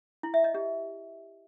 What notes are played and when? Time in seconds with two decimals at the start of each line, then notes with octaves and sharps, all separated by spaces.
0.23 E4
0.34 E5
0.44 D#5
0.54 G4